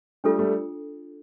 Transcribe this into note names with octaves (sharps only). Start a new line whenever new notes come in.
G3 A3 D4 F4 A4
G3 A3